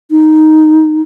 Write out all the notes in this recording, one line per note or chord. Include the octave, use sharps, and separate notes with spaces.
D#4